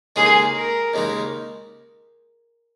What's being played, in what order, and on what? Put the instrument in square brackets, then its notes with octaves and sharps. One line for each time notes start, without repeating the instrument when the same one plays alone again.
[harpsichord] D#2 C#3 G#3 D#4 [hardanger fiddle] G#4
[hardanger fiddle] A#4
[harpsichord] D#2 C#3 G#3 D#4